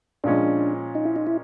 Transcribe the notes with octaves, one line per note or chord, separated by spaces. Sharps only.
A#2 F3 G#3 C#4 D4
D#4
E4
D#4
E4